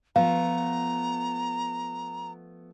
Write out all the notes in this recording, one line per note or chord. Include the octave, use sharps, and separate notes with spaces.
F3 A3 B3 F5 A#5